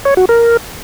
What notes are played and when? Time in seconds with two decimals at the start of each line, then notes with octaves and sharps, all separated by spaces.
0.05 C#5
0.17 F#4
0.29 A#4